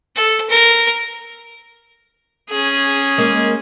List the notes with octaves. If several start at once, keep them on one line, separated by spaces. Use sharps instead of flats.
A4
A#4
C#4 G#4
G#3 A#3